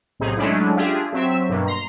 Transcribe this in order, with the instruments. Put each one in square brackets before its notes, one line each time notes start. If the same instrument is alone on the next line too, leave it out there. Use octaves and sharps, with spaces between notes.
[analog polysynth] B1 A2 C3 D#4 G#4
F#3 G#3 A3 C#4 D4 E4
D4 F4 G4 G#4 E5
F#3 C4 E5
G2 B2 A#3
A#5 C6